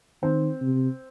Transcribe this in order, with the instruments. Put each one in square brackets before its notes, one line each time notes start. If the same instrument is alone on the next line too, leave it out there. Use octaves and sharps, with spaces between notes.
[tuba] D#3 [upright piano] C4
[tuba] C3